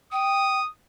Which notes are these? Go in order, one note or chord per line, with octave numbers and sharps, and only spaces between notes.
G5 D#6